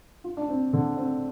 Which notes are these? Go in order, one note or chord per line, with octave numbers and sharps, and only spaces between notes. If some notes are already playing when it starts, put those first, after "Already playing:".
F4
D4
C4
D3
C4